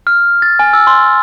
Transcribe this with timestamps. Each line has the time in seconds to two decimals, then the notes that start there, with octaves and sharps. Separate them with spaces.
0.07 F6
0.42 A6
0.59 G#5
0.73 E6
0.87 C6